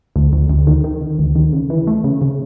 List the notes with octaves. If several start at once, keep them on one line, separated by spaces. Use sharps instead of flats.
D2
D2
D2
D#3
D#3
D#3
D2
D#3
C#3
E3
A3
C#3
C#3